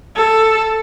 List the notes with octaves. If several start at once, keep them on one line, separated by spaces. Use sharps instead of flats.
A4